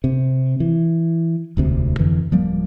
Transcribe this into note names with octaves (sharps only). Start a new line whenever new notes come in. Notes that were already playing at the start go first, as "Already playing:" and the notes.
C3
E3
E1 D2 C3
F2 D3 E3
D1 F3 G3 A#3